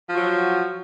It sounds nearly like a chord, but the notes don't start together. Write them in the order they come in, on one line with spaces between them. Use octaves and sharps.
F3 F#4 F#3